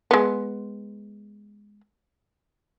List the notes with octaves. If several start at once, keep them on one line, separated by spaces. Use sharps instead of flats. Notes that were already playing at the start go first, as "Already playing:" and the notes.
G#3 B3